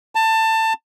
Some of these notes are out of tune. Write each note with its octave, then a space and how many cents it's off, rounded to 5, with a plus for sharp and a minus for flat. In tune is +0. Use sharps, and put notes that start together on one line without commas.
A5 +20